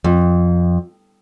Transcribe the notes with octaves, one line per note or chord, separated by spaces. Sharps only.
F2